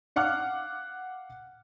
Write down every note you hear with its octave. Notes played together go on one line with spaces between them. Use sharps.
F5 F#5 D6 F6 F#6